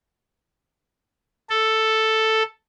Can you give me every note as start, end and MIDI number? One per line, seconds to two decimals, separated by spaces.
1.50 2.43 69